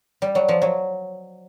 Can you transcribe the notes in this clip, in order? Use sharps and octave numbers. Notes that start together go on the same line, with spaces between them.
G3
F#3
F3
F#3